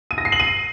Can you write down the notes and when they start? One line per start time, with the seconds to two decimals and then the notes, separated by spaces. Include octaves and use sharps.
0.11 D#7
0.18 A#6
0.25 C7
0.32 F#7
0.40 D#7